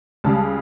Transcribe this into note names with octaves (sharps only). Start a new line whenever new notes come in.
C#2 C#3 G3 A5